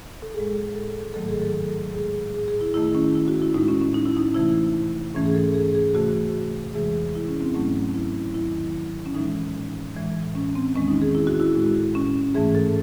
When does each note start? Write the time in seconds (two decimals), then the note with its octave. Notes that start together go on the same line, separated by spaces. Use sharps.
0.22 A4
0.34 A2 G#4
0.40 G#3
0.75 A4
1.14 G#2 D#3 F#3 A3 A4
1.28 G#4
1.42 A4
1.94 A2 G#3 G#4
2.34 G#4
2.48 G#4
2.61 E4
2.74 F#2 D#3 A3 E4
2.95 C#4
3.15 E4
3.28 F#4
3.42 E4
3.54 A2 D#4
3.58 G#3
3.68 C#4
3.81 C#4
3.94 D#4
4.06 E4
4.17 D#4
4.34 C3 E3 A3 E4
5.15 G#2 E3 A3 C#4
5.26 G#4
5.35 A4
5.54 G#4
5.75 G#4
5.95 C3 E3 A3 F#4
6.74 E2 C3 E3 G#3 G#4
7.15 E4
7.28 C#4
7.41 C4
7.54 G#2 F#3 A3 C#4
7.95 E4
8.34 E2 D#3 F#3 E4
9.06 C#4
9.15 A2 E3 G#3 D#4
9.95 A2 E3 G#3
10.35 C#4
10.55 C4
10.74 E2 D#3 G#3 C#4
10.88 D#4
11.02 G#4
11.15 E4
11.27 F#4
11.40 E4
11.55 A2 G#3
11.95 C#4
12.14 C#4
12.34 G#2 E3 A3 G#4
12.55 A4